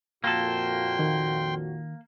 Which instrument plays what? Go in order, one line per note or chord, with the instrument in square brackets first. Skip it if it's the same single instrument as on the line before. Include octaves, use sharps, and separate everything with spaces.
[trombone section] F2 A#2 F#4 [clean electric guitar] A#3 A4 [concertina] G5 C6
[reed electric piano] D#3